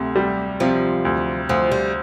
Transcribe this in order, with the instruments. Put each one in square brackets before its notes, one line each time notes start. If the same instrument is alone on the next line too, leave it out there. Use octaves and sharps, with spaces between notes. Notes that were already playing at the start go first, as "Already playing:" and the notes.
Already playing: [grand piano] D2 C3 [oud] A3
[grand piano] G3
[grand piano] C3 [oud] F3
[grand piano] D2
[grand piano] D2 [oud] F3
[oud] G3